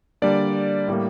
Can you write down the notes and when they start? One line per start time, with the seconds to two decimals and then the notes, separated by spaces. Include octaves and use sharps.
0.22 D3 G3 A#3 D4 D5
0.88 A2 G3 A#3